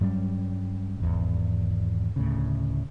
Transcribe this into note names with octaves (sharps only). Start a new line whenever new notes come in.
G2 F#3 G3 C#4
G#1 E2
D2 A2 C#3